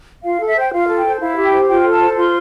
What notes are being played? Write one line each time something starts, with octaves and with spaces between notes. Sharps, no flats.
F4 F5
A4
E5
C5
G5
F4 F5
A4
G5
C5
E4 F5
G4
G5
C5
F4 G5
A4
A5
C5
F4 C6